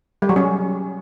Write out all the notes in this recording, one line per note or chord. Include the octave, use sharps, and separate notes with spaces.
G3
F#3
C#4